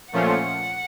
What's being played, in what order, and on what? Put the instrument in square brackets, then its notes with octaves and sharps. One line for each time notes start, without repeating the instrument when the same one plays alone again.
[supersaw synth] A#2 F3 A3 C#4 F4 [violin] F#5